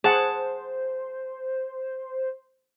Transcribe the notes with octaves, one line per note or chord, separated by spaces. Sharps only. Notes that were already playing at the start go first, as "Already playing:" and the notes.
G#4 C5 F#5 A5